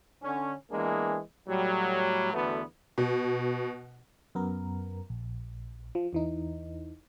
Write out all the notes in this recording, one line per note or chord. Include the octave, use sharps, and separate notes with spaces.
D3 C#4
E3 G#3 A#3 B3 D4 G#4
A2 F#3 G3
E2 D3 A3 B3 F#4 B4
B2
F#2 B3 A#4
A#1
F3
E2 E3 D#4